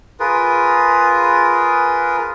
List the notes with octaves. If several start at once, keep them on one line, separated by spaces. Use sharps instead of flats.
F4 G#4 A#4 B4